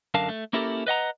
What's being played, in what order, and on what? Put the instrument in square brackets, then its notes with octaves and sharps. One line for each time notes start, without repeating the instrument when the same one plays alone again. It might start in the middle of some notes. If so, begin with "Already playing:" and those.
[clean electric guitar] F#2 D3 A#4 F5 A5
A3
A#3 C#4 E4 G4 A4 A#4
B4 D#5 F#5 A#5